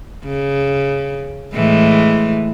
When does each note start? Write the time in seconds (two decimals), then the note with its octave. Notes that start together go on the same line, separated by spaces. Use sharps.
0.25 C#3
1.53 A2 E3 G#3